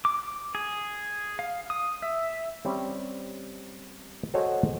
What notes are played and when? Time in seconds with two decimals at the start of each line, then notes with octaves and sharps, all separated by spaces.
0.05 D6
0.55 G#4
1.39 F5
1.70 D#6
2.02 E5
2.65 G3 C4 C#4
4.34 F#4 G#4 A4 C5 C#5 D#5